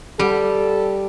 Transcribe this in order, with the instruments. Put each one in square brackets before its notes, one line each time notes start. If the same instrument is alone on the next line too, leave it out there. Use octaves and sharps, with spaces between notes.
[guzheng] G3 [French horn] A4